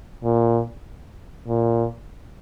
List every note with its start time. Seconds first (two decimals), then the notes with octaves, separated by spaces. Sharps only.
0.24 A#2
1.48 A#2